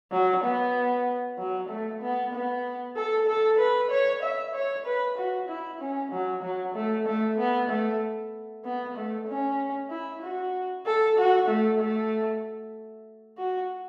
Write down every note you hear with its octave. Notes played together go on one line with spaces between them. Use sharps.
F#3
B3
F#3
A3
B3
B3
A4
A4
B4
C#5
E5
C#5
B4
F#4
E4
C#4
F#3
F#3
A3
A3
B3
A3
B3
A3
C#4
E4
F#4
A4
F#4
A3
A3
F#4